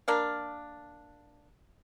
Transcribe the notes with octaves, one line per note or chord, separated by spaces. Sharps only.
A#3 D4 F5